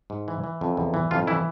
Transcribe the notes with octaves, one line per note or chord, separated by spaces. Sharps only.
G#2
E3
E3
F2
E2
E3
F2 F4
E3 E4